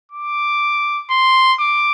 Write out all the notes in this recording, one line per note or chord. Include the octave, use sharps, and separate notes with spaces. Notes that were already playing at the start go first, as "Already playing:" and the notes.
D6
C6
D6